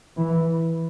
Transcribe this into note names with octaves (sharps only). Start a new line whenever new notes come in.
E3